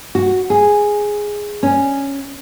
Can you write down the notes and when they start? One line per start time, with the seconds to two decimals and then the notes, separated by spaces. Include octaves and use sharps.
0.15 F#4
0.50 G#4
1.63 C#4